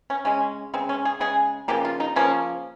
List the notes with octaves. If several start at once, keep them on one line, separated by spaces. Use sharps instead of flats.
C#4
C#3 G#3 C#4
C#3 G#3 C4
C#4
G#4
C#3 G#3 G#4
C#3 F3 A#3 G4
F4
D#4
C#3 F3 A#3 C#4